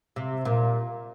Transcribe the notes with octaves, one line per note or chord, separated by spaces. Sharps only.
C3
A#2